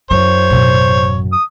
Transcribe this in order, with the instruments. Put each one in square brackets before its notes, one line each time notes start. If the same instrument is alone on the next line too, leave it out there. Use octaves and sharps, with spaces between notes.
[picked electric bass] F#2 [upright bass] E4 [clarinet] C5 [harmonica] C#5
[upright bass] A1 B2
[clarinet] D#6